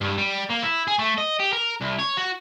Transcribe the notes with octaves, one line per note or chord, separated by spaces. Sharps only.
G2
G3
A#3
E4
G#4
A3
D#5
G4
A#4
C2
C#5
F#4